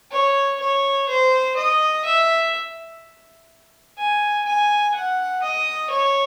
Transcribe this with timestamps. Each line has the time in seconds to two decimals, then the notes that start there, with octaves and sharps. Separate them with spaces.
0.12 C#5
0.61 C#5
1.09 C5
1.57 D#5
2.05 E5
3.98 G#5
4.46 G#5
4.94 F#5
5.42 D#5
5.90 C#5